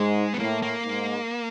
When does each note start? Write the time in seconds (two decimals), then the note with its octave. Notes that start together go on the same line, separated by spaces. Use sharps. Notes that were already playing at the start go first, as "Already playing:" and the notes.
Already playing: G#2 G#3
0.33 B3
0.39 A2 A#3
0.62 A#3
0.85 G#2